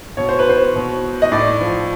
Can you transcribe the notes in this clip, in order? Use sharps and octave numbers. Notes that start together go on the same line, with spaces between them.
B2 C#5
C5
B4
C5
B2
D#5
A2 D5
F3